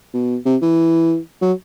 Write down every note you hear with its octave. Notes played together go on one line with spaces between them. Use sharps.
B2
C3
E3
F#3